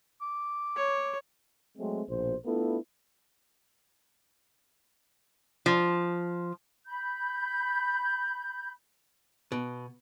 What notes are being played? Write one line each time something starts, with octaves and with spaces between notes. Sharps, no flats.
D6
C#5
F#3 G#3 A3 C4
A#1 B2 C5
A3 B3 D4 E4 F4 A4
F3
B5 G6
B2